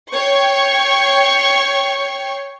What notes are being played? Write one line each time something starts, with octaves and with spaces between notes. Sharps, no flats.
C#5 G5 C#6 C7